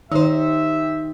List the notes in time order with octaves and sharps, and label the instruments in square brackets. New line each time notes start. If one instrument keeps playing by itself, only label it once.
[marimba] D#3 [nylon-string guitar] D#4 C5 [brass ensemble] G4 E5